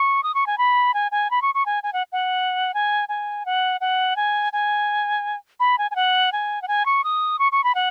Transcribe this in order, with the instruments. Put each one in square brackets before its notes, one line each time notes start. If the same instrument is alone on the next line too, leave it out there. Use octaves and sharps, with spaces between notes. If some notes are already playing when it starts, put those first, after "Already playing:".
Already playing: [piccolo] C#6
D#6
C#6
G#5
B5
G#5
G#5
B5
C#6
C#6
G#5
G#5
F#5
F#5
G#5
G#5
F#5
F#5
G#5
G#5
B5
G#5
G#5
F#5
G#5
F#5
G#5
C#6
D#6
C#6
C#6
B5
F#5